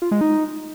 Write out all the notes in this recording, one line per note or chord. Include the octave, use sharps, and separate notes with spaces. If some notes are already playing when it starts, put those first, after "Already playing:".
F4
G#3
D#4